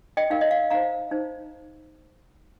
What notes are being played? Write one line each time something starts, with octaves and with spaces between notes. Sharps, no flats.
D#5 G5
D#4 A#4 F5
D#5
F5
D#4 C5 F5 A#5
D#4 C5